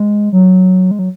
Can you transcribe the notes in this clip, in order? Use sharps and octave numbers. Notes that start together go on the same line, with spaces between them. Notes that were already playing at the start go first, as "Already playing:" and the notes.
Already playing: G#3
F#3
G#3
F#3